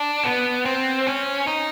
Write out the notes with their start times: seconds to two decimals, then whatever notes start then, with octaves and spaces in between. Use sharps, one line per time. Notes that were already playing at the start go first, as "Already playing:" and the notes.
Already playing: D4
0.25 B3
0.65 C4
1.07 C#4
1.47 D#4